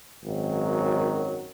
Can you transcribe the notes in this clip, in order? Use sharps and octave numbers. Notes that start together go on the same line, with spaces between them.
G#1 F#2 D#3 F#3